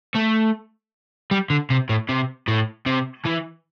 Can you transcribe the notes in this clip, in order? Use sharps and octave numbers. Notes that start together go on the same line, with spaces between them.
A3
G3
D3
C3
A2
C3
A2
C3
E3